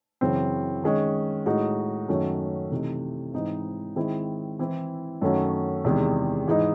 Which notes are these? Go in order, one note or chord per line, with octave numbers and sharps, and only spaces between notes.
F#2 C#3 E3 C4
D#3 G#3 C#4
A2 G#3 D#4 F#4
F#2 D#3 A3 C#4 F#4
C3 E3 A3 D#4
G#2 E3 C4 D#4
D#3 G#3 C4 E4
E3 C4 E4
F#2 D#3 A3 C#4 F#4
E2 C3 D#3 G#3
G#2 E3 G#3 D#4